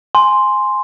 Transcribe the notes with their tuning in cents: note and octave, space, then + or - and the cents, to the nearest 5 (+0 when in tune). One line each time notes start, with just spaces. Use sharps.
G#5 +5 C6 +0